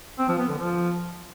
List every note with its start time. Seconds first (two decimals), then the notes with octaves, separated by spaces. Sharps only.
0.19 C4
0.29 F3
0.38 B3
0.48 D3
0.58 F3